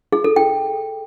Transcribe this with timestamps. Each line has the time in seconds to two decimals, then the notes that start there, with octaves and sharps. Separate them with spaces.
0.12 G#4
0.24 A4
0.36 G5